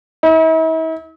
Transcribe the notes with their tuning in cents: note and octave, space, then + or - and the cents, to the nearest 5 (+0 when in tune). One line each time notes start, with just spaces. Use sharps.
E4 -45